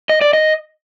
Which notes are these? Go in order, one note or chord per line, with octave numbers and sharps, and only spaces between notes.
D#5
D5
D#5